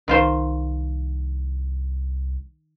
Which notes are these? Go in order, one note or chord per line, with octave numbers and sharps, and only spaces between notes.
C2 D#3 F4 C5